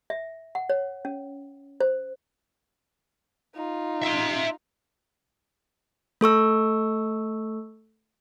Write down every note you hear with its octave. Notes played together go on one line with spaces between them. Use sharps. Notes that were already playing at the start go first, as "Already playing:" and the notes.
E5
F#5
C#5
C#4
C5
D#4 F4
E5 C6
A3 A4 C#6 E6